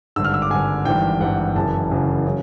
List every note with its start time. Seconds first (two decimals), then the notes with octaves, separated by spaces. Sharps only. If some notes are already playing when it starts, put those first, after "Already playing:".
0.16 G#1 G2 D3 E6
0.24 F6
0.34 E6
0.42 D6
0.50 G#1 G2 D3 G#5
0.85 G#1 G2 E3 G5
1.20 G#1 G2 E3 F#5
1.55 F#1 F#2 C#3 E3 A5
1.91 F#1 F#2 C#3 E3
2.26 C#3 F#3